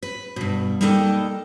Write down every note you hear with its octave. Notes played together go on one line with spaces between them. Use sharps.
B4
G2 B2
G3 A#3 D#4 A4 D#5 G5